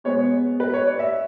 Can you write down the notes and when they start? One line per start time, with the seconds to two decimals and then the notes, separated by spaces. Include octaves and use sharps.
0.04 B2 G#3 B3 C#5
0.60 B4
0.74 C#5
0.86 D5
0.99 E5